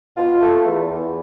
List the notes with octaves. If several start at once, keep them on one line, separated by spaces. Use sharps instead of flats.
B2 F4
A3
E2
E2